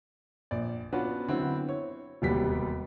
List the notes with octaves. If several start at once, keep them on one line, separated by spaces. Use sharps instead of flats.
A#1 D5
B3 C#4 D4 F4 F#4
D3 F#3 B3 C4 E4
C#5
E1 D#2 C3 G3 B3 B6